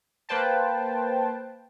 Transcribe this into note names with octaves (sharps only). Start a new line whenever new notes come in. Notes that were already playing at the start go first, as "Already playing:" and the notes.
A#3 B4 C5 G5 A5